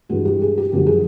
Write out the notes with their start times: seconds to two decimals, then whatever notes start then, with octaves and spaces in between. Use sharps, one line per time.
0.09 G2 E3 G#3 F#4
0.25 G4
0.42 G#4
0.58 G4
0.73 F#2 D3 F3 G#3 G4
0.86 G#4